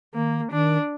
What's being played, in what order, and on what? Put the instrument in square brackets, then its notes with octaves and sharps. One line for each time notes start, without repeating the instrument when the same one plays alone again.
[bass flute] D#3 [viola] A#3
[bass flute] D#3 [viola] D4